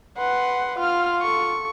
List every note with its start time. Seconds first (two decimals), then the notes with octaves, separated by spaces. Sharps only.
0.18 B4 F#5 C6
0.79 F4 F6
1.22 A4 C#6